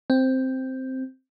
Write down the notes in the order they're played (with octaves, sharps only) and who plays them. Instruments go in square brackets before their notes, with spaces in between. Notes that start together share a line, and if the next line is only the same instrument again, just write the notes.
[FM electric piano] C4